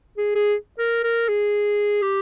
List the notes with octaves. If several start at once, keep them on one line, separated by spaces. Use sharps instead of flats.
G#4
G#4
A#4
A#4
G#4
G4